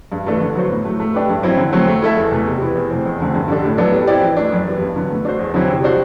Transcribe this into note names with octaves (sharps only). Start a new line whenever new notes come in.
G2
E3 A3 D4 A4
D3
F#3 B3 F#4 C5
A2
F#3 A3
A3
D4 G4 B4
G2
F#3 C4 E4
D3
F#3 A3 C4
A3
E4 A4 E5
E2
B2 A3
C3
E3 B3 E4
E2
B2 A3 C4
E2
D3 A3 C4
G2
D3 G3 D4 A4
A2
F#3 B3 D4 A4
G3
C4 E4 G4 D5
E3
A3 D4
F#2
E3 G3 B3
G2
D3 F#3 B3
A3
D4 F#4 C5
E2
D3 F#3 C4 E4
C3
G3 D4 F#4 C5